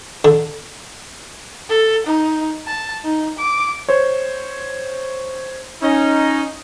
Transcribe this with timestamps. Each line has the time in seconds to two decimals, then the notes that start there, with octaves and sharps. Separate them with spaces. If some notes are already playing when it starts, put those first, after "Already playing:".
0.25 D3
1.69 A4
2.06 D#4
2.66 A5
3.04 D#4
3.38 D6
3.89 C5 C#5
5.82 C#4 D#4